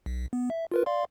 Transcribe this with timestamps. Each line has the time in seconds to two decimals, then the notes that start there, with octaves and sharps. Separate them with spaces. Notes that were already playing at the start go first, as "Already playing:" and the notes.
0.06 B1
0.33 B3
0.50 E5
0.72 F4 A#4 B4
0.86 D5 F5 C6